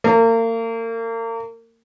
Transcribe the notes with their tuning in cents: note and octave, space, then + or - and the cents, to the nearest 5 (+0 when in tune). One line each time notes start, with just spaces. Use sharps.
A#3 -35